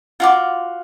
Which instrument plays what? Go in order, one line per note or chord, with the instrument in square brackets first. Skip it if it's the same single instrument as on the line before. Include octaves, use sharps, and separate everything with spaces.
[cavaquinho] F4 F#4 D6